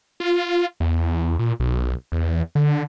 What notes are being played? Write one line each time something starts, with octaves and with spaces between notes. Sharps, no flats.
F4
E2
A#2
B1
E2
D3